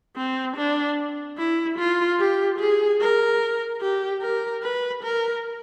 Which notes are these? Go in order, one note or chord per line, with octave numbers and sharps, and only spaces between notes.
C4
D4
E4
F4
G4
G#4
A#4
G4
A#4
B4
A#4